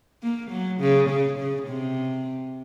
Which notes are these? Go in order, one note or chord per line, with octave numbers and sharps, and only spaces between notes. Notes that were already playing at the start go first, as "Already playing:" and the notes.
A#3
F#3
C#3
C#3
C#3
C3